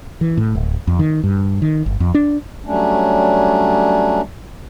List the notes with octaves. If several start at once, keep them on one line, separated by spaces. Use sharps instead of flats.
E3
A2
D1
F2
D#3
G2
D#3
G1
F2
D4
F#3 G3 A3 C#4 D4